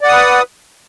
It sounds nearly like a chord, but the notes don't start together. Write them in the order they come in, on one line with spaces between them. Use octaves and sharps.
D5 F#5 D#6 B4